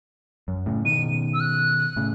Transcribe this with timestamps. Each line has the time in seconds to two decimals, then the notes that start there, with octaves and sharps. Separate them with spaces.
0.48 F#2
0.66 A2 C#3
0.85 B2 D#3 D#7
1.34 E6
1.40 F#6
1.96 A2 C#3